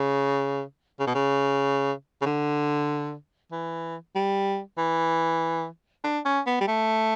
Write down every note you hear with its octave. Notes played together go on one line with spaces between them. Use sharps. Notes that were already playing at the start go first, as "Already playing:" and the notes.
Already playing: C#3
C#3
B2
C#3
C#3
D3
E3
G3
E3
D4
C#4
B3
G3
A3